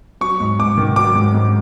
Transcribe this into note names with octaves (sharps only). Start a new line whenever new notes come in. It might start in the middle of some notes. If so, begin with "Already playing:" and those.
F#3 C#6
G#2
G#2 D6
D#3
F#3 D6
G#2
G#2